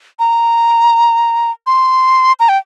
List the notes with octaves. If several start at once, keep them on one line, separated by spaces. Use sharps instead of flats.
A#5
C6
A#5
G5